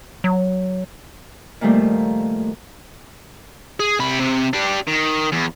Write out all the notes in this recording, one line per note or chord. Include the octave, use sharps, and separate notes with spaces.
F#3
A#2 D#3 F3 G3 A3 A#3
G#4
C3 B5
C3
D4 G4
D#3
E2